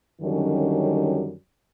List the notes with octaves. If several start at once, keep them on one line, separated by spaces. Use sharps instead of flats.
F#2 D3 D#3 F#3 G3 C#4